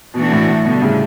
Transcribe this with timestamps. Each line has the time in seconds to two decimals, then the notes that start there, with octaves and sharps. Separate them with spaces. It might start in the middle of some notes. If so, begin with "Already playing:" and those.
0.14 B2 E3 A3 D4 F#4
0.32 A2
0.48 A2
0.65 B2 D3 G3 D4
0.82 A2 C#3